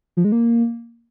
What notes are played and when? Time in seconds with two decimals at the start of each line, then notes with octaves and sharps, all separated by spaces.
0.17 F3
0.25 G#3
0.32 A#3